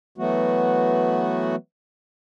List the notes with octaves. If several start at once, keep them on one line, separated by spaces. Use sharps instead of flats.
E3 F#3 A3 B3 F#4